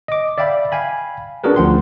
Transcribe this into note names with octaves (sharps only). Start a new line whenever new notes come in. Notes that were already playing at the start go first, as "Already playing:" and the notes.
D#5 D6
D5 E5 F5 G5 B5
F5 G5 G#5 B5
C#4 D4 F#4 G#4 A#4 B4
D2 F3 F#5 G5 C6